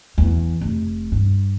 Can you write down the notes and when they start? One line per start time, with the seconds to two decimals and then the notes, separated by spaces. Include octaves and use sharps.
0.18 E2
0.61 F1
1.12 G2